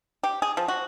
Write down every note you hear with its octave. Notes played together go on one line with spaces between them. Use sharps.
G4
G#4
F3
F#4